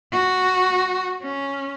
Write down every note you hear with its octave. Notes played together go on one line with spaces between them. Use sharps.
F#4
C#4